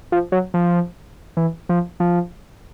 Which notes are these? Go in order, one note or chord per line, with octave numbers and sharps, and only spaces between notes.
F3
F#3
F3
E3
F3
F3